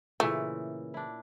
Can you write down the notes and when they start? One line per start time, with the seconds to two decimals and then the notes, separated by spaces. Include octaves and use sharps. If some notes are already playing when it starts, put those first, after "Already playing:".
0.20 A#2 C#3 E3 A3
0.94 D4 E4